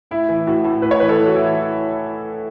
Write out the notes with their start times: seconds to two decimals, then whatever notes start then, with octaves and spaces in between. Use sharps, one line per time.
0.11 A2 E4
0.29 E3
0.47 A2 F#4
0.64 A2
0.82 A2 B4
0.91 C#5
1.00 E3 B4
1.09 A4
1.18 E3
1.26 F#4
1.35 E3 E4